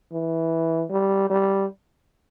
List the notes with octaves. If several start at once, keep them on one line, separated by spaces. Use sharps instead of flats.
E3
G3
G3